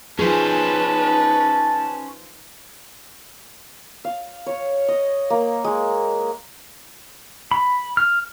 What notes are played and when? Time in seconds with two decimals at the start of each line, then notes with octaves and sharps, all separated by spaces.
0.19 F3 C#4 D#4 G#4 B4 C5 A5
4.05 F5
4.46 C#5
4.88 D#5
5.30 A#3
5.64 G#3
7.51 B5
7.97 F6